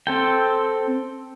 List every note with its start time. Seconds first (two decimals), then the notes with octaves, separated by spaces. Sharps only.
0.07 C4 A4 G5